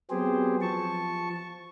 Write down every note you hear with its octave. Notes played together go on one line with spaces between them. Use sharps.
F#3 B3 C4 G4 G#4 C5
F3 A5 C#6